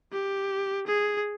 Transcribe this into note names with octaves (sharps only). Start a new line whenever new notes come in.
G4
G#4